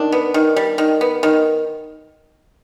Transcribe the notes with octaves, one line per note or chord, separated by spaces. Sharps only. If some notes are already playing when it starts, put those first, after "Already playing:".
Already playing: D#3 D4
B3
D#3
G3
D#3
B3
D#3